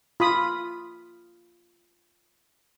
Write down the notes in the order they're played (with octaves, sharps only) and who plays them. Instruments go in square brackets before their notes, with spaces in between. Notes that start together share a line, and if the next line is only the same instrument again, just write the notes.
[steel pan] F4 B5 D#6